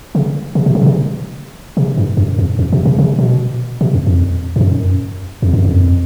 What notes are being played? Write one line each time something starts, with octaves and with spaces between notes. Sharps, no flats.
C#3
C3
B2
C#3
B2
C3
C3
G2
F#2
F2
F2
B2
C3
C3
B2
B2
F2
F2
G2
F#2
F2
F#2
F2